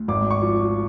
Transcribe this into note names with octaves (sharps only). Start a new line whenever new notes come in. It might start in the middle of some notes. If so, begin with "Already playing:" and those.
Already playing: D2
G#1 D6
C#6
F3